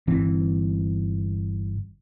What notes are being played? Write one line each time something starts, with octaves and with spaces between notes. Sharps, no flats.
G1 E3 C4